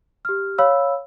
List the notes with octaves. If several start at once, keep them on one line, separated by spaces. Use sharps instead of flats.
G4 F6
C#5 F5 B5 E6